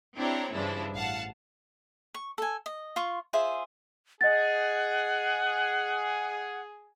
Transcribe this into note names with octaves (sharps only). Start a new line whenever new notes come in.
C4 D4 E4 G4 C#5 A#5
G2 C#3 E3 F3 D4 E4
A1 F5 F#5 A5
C#6
A4 G#5
D#5
F4 C6 C#6
F4 G#4 C5 E5
G#4 D#5 F#5 A6